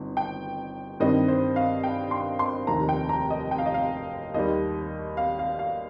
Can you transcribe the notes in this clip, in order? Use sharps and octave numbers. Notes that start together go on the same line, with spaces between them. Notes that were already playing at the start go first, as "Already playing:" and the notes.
Already playing: G1 C4 D#4
G5
G2 D#3 G3 C4 D#5
C5
F5
G5
C6
C6
F1 D#2 D#3 A#5
G5
A#5
D#5
G5
F5
D#5
F5
D#2 D#3 G3 D#5
F5
F5
F5